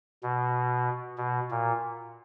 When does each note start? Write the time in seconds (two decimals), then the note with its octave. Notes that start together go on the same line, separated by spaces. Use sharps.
0.23 B2
1.18 B2
1.50 A#2